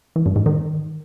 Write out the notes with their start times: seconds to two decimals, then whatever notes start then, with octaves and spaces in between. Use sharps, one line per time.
0.16 E3
0.26 G2
0.36 G#2
0.46 D#3